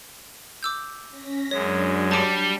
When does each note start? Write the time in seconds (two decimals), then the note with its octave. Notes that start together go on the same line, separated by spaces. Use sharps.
0.63 D6 E6 G6
1.09 C#4 A#6 B6
1.51 F#2 F#3 G#3 D4 C#5
2.11 G3 A5 D6